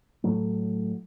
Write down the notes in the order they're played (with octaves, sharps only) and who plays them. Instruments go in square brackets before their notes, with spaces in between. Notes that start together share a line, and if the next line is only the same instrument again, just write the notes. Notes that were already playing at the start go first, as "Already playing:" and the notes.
[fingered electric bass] A2 F#3 A3